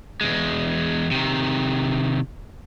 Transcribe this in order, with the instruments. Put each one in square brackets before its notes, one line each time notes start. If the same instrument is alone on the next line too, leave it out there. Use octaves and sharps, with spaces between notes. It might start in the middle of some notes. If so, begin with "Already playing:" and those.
[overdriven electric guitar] E2 G#3
C3 D#3